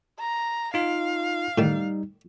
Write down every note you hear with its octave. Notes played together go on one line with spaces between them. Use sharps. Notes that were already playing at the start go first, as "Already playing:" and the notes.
A#5
D#4 F4 F5
A2 D#3 G3 D#4